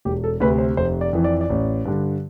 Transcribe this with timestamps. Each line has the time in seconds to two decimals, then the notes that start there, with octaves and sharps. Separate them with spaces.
0.05 E1 G4
0.24 A4
0.40 D2 B4
0.44 C3
0.58 C5
0.77 F1 C5
1.01 D5
1.13 F2 E3
1.24 D5
1.41 D5
1.50 A1
1.85 G2 D3